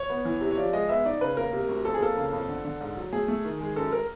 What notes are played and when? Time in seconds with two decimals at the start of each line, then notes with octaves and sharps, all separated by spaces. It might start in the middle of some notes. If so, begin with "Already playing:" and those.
Already playing: C#5
0.10 B3
0.25 E3
0.41 C3
0.51 C#5
0.57 F3 D5
0.73 G#3 D#5
0.89 B3 E5
1.05 D#4 D5
1.21 C#3 B4
1.37 A#3 A#4
1.53 C3
1.69 D2
1.85 F2 A4
1.94 G#4
2.01 A#3 A4
2.17 C#3
2.33 F2
2.49 D3
2.65 D3
2.81 G#2
2.97 F#3
3.13 A3 G#4
3.28 A3
3.45 D#3
3.60 G#3
3.76 F#2 A4
3.92 A#4